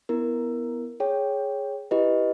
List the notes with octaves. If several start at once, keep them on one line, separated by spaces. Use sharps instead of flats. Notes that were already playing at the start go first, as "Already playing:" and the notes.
B3 E4 A#4
G#4 C#5 G5
E4 G4 B4 D#5